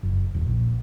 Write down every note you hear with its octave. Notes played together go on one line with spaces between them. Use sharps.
F#1
D#1
A#1